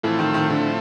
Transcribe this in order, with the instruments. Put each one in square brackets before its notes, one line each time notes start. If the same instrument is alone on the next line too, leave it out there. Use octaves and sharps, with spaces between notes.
[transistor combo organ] A2 F3 A3 C4 E4 [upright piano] E3
[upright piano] D#3
D#3
D3